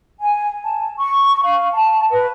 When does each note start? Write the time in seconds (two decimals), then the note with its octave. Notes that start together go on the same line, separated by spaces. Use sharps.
0.19 G#5
0.62 A5
0.97 C#6
1.42 F5
1.73 A5
2.11 B4